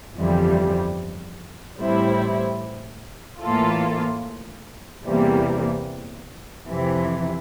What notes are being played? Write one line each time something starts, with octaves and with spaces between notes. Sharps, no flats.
G1 F2 E3 G3
A1 A2 G3 C4 E4
A2 E3 A#3 F4 A4
E2 C3 E3 G3 A#3
F2 C3 E3